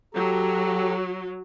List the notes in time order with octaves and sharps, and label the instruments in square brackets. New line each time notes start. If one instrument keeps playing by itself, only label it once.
[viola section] F#3 [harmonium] G4 A4 A#5